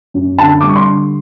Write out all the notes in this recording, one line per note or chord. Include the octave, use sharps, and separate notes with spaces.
F#2
D3 A5
G3 D6
C#6
C6
D3